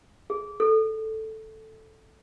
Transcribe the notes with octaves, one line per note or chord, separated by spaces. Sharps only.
G#4
A4